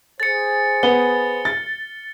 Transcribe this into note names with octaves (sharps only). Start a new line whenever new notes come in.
G#4 C5 A6 C#7
B3 G7
A6